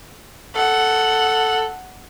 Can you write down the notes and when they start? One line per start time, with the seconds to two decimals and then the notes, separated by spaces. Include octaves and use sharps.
0.56 A4 F#5